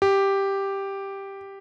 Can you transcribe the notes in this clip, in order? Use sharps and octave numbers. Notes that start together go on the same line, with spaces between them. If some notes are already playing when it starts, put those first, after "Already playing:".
G4